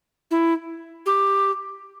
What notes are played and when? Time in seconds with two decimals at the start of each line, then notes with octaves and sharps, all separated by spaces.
0.31 E4
1.06 G4